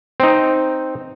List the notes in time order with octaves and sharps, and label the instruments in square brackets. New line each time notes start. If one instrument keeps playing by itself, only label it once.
[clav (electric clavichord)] C4 D#4